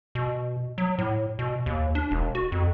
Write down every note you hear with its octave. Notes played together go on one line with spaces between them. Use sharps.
B2
F#3
A2
B2
D#2
D4
E1
F#4
F2